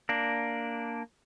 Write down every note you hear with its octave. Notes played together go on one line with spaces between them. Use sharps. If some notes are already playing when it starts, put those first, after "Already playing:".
A#3 D4